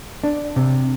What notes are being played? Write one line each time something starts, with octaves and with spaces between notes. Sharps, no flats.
D4
C3